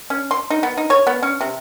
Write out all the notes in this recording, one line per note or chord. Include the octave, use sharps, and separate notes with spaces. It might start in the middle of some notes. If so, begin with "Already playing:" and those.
C#4
C6
D#4
B3
D#4
C#5
B3
C#4
C3